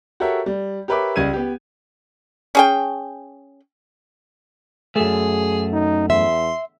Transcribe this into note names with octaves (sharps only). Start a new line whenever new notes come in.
F#4 G4 A4 A#4 C#5 E5
G3
G4 A#4 B4 C#5 E5 D6
C#2 G3 G#6 D#7
B3 G4
C#4 G#4 G5
F#2 A3 G#4
D#4
E2 E5 C6